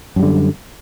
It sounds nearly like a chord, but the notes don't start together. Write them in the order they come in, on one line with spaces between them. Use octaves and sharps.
F#2 G3 D3